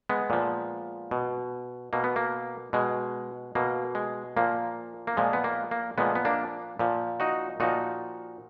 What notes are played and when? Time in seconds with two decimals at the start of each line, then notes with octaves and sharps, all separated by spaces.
0.09 G#3 B3
0.30 A#2 F3
1.11 B2
1.93 B2 A#3
2.04 B3
2.16 A#3
2.73 B2 G#3
3.55 B2 A#3
3.95 G#3
4.37 A#2 F3 A#3
5.07 A#3
5.17 A#2 F3 G#3
5.33 B3
5.44 A#3
5.71 A#3
5.98 A#2 F3 G#3 B3
6.15 B3
6.25 A#3 D4
6.79 A#2 F3
7.20 D#4 F#4
7.60 A#2 F3 D#4 F#4